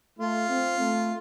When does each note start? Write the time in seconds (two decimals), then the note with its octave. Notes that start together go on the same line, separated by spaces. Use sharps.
0.18 A3 F4
0.49 C4
0.80 A3